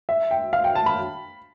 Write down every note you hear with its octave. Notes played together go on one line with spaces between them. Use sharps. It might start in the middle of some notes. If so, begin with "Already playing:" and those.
E5
G5
F5
G5
A5
B5